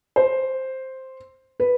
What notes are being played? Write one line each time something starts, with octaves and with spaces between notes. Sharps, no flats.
C5
B4